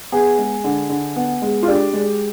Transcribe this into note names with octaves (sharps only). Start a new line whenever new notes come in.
B3 G#4
G#3
D3
D3
B3
G#3
F4
D4 G4
G#3